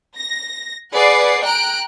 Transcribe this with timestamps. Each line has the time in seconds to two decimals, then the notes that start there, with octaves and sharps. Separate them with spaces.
0.17 A#6
0.92 G#4 B4 D5 F#5 C7
1.43 G5 A#5 F#6 D7